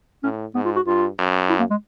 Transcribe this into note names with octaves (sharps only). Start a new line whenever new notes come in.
A2 C#4
G#2 B3
F4
F#4
G2 F4
F#2
E4
A#3
G#3